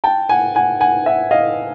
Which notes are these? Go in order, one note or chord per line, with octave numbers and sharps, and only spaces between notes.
G5 A5
F#5 G#5
F#5 G#5
F#5 G#5
E5 F#5
D#5 F5